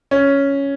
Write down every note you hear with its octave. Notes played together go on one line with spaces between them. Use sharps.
C#4